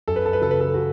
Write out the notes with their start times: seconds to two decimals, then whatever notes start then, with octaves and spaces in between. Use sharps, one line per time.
0.08 F#2 A4
0.16 B4
0.26 A4
0.33 B4
0.41 C#3 F#3 A4
0.51 B4
0.60 A4
0.74 F#4